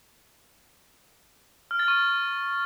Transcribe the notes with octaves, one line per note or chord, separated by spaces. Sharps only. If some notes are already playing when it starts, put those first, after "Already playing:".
F6
A6
C#6